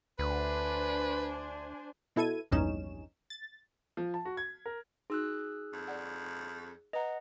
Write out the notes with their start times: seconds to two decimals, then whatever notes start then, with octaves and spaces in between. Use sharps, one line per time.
0.19 D2 D4 B4 C5 G#5
2.16 B2 E4 A4 G#6 D#7
2.52 A#1 E2 G2 C#4 D#4 E7
3.30 A6
3.97 F3
4.14 A5
4.25 F#4
4.37 G#6
4.66 A#4
5.10 D#4 F#4 G#4 E6 F#6
5.73 F2
5.88 D5 F#5
6.93 B4 D#5 F#5 A#5